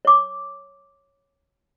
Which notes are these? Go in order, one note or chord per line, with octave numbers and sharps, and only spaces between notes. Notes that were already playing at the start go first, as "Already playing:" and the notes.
C#5 D6